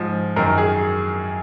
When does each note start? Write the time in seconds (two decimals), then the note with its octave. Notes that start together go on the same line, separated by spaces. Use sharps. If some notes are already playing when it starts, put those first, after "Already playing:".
Already playing: G#2 F3
0.36 F#2 D#3 A#4
0.58 G#4